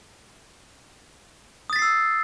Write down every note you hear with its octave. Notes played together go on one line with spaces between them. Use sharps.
D#6 E6 A6 B6 C7